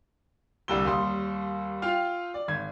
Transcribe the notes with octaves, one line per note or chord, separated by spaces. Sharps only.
C2 D3 G3 E6 G7
D#2 G3 C6 D#6
F4 F5 G5
D5
G#1 G#6